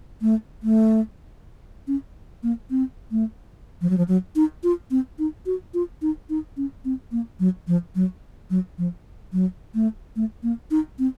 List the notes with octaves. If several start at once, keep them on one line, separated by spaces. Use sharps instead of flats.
A3
A3
C#4
A#3
C4
A3
F3
F#3
F3
F#3
D#4
F4
C4
D#4
F#4
F4
D#4
D#4
C#4
C4
A#3
F#3
F3
F#3
F#3
F3
F#3
A3
A3
A#3
D#4
C4